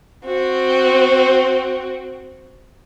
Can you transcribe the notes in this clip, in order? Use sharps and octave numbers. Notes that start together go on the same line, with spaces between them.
C4 F#4